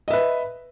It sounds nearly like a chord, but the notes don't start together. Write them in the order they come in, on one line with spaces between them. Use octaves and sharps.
D#5 E5 B4